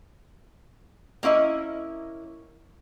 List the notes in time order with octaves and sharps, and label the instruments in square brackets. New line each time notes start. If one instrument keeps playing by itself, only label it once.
[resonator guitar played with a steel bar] A#3 C#4 E4 D#5